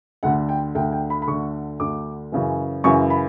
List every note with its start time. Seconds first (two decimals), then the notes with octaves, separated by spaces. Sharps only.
0.23 D2 D3 F#5
0.49 G5
0.75 D2 D3 G5
0.92 G5
1.10 B5
1.22 B5
1.28 D2 D3 C#6
1.80 D2 D3 D6
2.32 F#2 C#3 E3
2.84 F#2 C#3 E3 C#6
3.10 B5